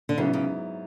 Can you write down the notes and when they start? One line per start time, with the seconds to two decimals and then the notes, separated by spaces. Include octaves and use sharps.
0.09 D3
0.17 G#2 C#3 F#3 B3 E4
0.33 C#3